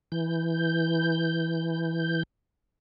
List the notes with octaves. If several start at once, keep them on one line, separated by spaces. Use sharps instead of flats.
E3 G6